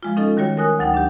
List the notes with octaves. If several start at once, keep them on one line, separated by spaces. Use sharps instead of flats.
F3 G#3 F4
C#4 D#4 F4 A4 D#5
D#3 G3 F#4 C#5
A#4 G#5 D#6 F#6
D2 F#3 D#4 F#5 G5
D4 G4